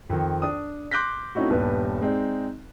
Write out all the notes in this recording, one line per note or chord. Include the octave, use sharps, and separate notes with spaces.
F2 D#3
D4 D#6
C6 D6 F#6 G6 A#6 B6
A3 C4 C#4 D#4 E4 F#4
D#1 G2 B3 B4
G#3 C4 D#4 D5